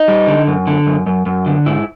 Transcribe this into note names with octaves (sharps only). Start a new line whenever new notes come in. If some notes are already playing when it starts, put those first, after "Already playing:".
Already playing: D#4
G3
D3
F#2
D3
F#2
F#2
F#2
D3
G#2 E4